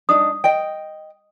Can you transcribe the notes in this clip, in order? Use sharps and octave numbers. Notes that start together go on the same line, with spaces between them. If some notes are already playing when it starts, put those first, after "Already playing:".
D4 D#4 D#5 D#6
D#5 G5